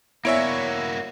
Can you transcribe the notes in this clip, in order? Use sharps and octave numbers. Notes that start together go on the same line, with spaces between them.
A#3 B3 E4 F#4 C#5 D5 E5 G#5